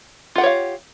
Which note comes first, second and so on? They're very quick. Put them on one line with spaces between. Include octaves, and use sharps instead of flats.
F4 F#5 G4 C#5 F5